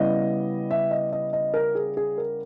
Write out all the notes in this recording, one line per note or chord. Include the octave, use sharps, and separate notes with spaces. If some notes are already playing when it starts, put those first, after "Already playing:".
Already playing: C#3 G3 B3 E4 D#5
E5
D#5
D#5
D#5
A#4
G#4
G#4
A#4